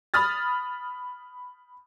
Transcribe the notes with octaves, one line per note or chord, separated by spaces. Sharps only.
B5 D#6 F6 A6